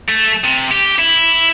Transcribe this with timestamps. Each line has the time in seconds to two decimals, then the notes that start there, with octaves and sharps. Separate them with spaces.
0.08 A3
0.44 C3
0.71 G4
0.98 E4